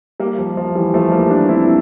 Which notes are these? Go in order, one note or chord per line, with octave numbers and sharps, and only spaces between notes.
G3 A#3
F3
F3
E3 G3
F3 A3
G3 A#3
A#3 D4
C4 E4